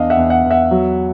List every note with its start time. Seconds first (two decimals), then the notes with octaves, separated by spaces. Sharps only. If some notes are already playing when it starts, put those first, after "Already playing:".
Already playing: E2 D4 D#5 F5
0.10 E5 F#5
0.17 E2
0.30 E5 F#5
0.44 E2
0.51 E5 F#5
0.71 F#3